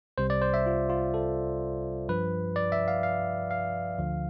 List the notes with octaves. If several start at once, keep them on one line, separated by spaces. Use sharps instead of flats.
C2 C3 G3 C5
D5
C5
E5
F4
F4
A4
G2 F3 B4
D5
E5
F5
F5
F5
D2 D3 F3